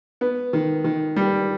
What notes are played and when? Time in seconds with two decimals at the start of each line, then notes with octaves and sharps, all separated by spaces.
0.21 B3
0.53 D#3
0.84 D#3
1.16 G3